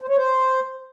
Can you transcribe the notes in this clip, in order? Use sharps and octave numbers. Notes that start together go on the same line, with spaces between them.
C5
C#5
C5